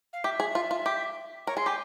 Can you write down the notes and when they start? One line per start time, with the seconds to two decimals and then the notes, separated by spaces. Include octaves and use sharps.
0.13 F5
0.24 G4 E5
0.40 G#4
0.55 F4
0.71 F4
0.86 G4
1.47 A#4 C#5
1.57 G#4 C6
1.66 G4 G#5